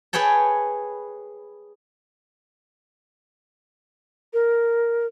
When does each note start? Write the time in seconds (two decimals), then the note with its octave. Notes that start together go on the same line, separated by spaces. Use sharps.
0.13 G#4 B4 C#5 G5 A5
4.33 A#4